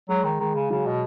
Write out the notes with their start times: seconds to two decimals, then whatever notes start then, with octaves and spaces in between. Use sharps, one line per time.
0.09 F#3 G#3
0.24 D#3
0.40 D#3 G#3
0.55 C#3
0.70 C#3 F#3
0.86 B2